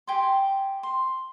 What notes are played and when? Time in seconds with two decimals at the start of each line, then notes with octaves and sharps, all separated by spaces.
0.07 G4 G5 G#5 C6
0.83 C6